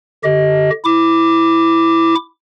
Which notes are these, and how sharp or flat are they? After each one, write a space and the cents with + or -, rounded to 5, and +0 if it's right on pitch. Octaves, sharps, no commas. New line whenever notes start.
D3 +0 G4 -20 D#5 +15
E4 +0 D6 +0